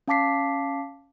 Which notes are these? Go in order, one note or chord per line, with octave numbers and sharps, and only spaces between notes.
C#4 F5 A5 D6 B6 C7